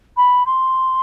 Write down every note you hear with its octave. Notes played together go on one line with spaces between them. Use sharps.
B5
C6